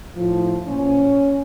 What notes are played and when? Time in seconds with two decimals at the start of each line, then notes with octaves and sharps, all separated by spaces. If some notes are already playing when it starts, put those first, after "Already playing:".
0.16 A2 F3
0.67 A#2 F3 C#4